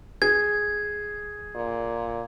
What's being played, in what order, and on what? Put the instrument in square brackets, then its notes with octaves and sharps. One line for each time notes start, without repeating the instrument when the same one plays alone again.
[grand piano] G#4 [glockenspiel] G#6
[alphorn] A#2